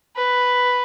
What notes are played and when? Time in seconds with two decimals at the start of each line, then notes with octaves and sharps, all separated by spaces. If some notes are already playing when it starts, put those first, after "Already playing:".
0.17 B4